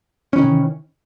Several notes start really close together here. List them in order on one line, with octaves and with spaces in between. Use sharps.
C#4 E3 D#3 C3